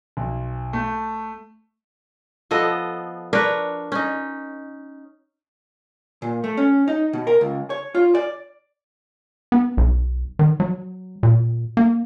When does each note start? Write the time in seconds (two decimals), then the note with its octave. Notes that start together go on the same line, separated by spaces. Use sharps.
0.17 B1
0.73 A3
2.51 F3 B3 A4 D#5
3.33 D4 A#4 B4 C#5
3.92 C#4 D#4
6.22 A#2
6.44 A3
6.57 C#4
6.88 D#4
7.13 B2
7.27 A#4
7.41 C#2
7.70 C#5
7.95 F4
8.15 D5
9.52 B3
9.77 B1
10.39 D#3
10.60 F#3
11.23 A#2
11.77 A#3